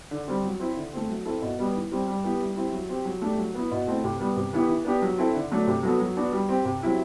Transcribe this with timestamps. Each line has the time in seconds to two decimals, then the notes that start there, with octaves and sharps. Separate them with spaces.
0.11 D3
0.27 G3 C4
0.44 F#3
0.60 C4 E4
0.76 D3
0.93 A3 C4
1.09 F#3
1.26 C4 E4 A4
1.42 B2
1.59 G3 B3
1.74 E3
1.92 G3 C4 G4
2.08 G3
2.24 B3 E4 G4
2.40 G3
2.56 C4 E4 G4
2.73 F#3
2.89 C4 G4
3.05 F#3
3.21 A3 D4 G4
3.39 F#3
3.55 B3 E4
3.71 B2
3.87 A3 C4 E4
4.04 C3
4.20 G3 B3
4.37 C3
4.53 E3 B3 E4 G4
4.69 E3
4.85 B3 D4 G4
5.02 F#3
5.18 C4 E4 A4
5.35 D3
5.51 F#3 A3 D4
5.67 C3
5.83 F#3 B3 F#4 A4
5.99 F#3
6.17 B3 D4 F#4
6.32 G3
6.49 C4 G4
6.65 C3
6.82 F#3 C4 E4 G4